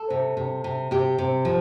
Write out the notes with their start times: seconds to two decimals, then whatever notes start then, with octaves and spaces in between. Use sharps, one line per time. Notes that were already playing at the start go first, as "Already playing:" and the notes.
Already playing: A4
0.10 C3
0.37 C3
0.64 C3
0.91 C3 G4
1.18 C3
1.45 F3